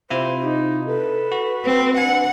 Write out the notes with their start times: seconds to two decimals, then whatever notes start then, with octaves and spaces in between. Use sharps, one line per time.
0.10 C3 E4 F4 C5
0.40 D#4 G4
0.87 A4 B4
1.32 F#4
1.65 C4
1.98 D4 F#5 G#5